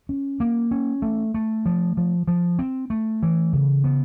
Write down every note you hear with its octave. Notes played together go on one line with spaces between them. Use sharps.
C#4
A#3
C#4
A3
A3
F3
F3
F3
C4
A3
E3
C#3
B3